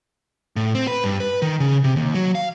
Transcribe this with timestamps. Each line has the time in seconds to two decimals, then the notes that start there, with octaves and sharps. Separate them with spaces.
0.56 A2
0.75 C4
0.88 B4
1.04 G2
1.20 B4
1.42 D#3
1.60 C#3
1.84 C3
1.96 D#2
2.14 F#3
2.35 F5